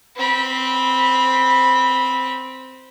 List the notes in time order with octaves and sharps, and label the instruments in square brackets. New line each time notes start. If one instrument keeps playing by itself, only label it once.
[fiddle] C4 B5